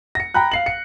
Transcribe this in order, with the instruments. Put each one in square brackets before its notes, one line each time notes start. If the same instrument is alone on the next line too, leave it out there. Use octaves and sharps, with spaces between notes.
[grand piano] A#6 C#7
G5 A#5 B5 F#6
F5 C7 F#7
C#7